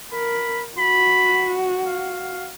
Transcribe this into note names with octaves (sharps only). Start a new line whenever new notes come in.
A#4 B5
F#4 B5
F5